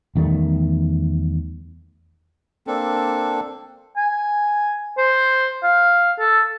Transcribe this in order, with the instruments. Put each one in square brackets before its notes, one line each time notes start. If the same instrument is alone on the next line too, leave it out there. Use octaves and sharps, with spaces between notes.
[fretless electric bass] E2 D#3 G3 A3
[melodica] A#3 C4 D4 A4
[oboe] G#5
C5
F5
A4